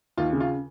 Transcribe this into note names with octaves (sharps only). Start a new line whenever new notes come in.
D#2 F4
C#3
F4